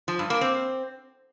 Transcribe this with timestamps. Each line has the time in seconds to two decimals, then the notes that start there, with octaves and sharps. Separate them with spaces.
0.08 F3
0.19 G2
0.30 A#3
0.41 C4